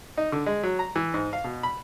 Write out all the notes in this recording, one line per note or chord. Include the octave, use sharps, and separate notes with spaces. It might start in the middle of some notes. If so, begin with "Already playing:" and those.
D#4
D3
G#3
F#3
A#5
E3
G#2
F5
B2
B5